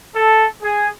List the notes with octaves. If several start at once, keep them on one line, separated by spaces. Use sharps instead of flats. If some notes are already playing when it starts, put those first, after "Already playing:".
A4
G#4